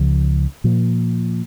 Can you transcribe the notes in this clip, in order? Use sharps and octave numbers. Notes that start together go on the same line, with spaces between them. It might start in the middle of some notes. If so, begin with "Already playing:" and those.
Already playing: C#2 C#3 F3
A#2 F3 A#3